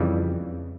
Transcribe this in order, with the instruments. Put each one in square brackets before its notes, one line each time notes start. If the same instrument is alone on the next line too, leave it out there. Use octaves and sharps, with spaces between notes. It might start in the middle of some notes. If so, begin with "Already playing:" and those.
Already playing: [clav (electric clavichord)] F2 C#3 E3 G3